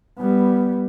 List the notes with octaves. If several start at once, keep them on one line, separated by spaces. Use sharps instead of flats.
G3 B3